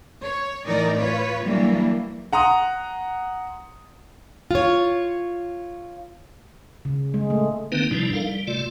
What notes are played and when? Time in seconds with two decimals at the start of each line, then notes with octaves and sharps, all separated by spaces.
0.22 C#5
0.64 A2 E3 D#4 A#4 D5
0.97 F4 B4 C#5
1.44 E3 F#3 G3 A#3 D4
2.33 F#5 A#5 C6 D#6
4.51 F4 C#5
6.85 C#3
7.14 G#3
7.30 A3
7.72 D3 D#3 A#3 C4 D#4 B4
7.91 G#2 C3 F3 G3 D4 E4
8.13 G3 D#4 A4 A#4 F5
8.27 G3
8.47 C3 A3 F4 D5